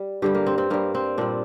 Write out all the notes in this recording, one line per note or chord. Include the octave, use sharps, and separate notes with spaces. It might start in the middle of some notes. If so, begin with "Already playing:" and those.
Already playing: G3
G2 D3 G3 G4
A#3
C4
C4
G2 G3 A#3
C4
A#2 G3 D4